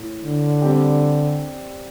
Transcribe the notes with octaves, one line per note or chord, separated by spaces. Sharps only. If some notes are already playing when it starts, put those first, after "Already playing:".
Already playing: A2
D3
G3 C4 G4